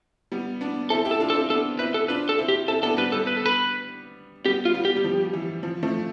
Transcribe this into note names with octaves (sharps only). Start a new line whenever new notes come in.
G3 B3
B3 D4
C4 E4 A4
E4 G4
A4
D4 F4
A4
C4 E4
B3 D4 A4
C4 E4 B4
A4
D4 F4 B4
A4
C4 E4
G4
C4 E4 A4
B3 D4 A4
G3 B3 B4
G3 B3 A4
B4
A4
B4
G3 B3 G4
F4
G3 B3
G4
G3
F3
E3
F3
F3 A3